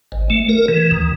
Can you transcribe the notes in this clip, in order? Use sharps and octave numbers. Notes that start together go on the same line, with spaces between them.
G#1
A3
A#4
E3
D#2